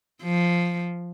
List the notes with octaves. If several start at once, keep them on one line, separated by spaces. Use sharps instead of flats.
F3